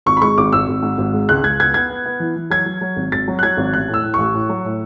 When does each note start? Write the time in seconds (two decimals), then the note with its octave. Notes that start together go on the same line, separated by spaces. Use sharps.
0.06 G#1 C#6
0.17 B5
0.22 G#3 C#6
0.38 G#1 D6
0.52 G#1 E6
0.68 G#1
0.82 G#2
0.98 G#1
1.13 G#3
1.29 C#2 F#6
1.44 C#2 G#6
1.60 B3 G#6
1.74 B3 G#6
1.90 B3
2.06 B3
2.20 E3
2.36 E3
2.50 F#3 G#6
2.66 F#3
2.81 F#3
2.96 G#1
3.12 G#1 A6
3.28 F#3
3.39 F#6
3.43 F#3 G#6
3.57 G#1
3.73 A1 F#6
3.88 A2
3.94 E6
4.03 A2
4.14 A1 C#6
4.34 A2
4.49 F#3
4.65 A2